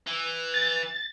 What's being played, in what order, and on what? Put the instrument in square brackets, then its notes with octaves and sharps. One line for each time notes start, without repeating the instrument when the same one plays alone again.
[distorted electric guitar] E3
[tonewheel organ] A6